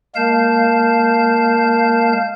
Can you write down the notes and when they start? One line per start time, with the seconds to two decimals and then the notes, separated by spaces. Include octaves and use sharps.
0.15 G#3 A#3 A#4 F5 A5 G6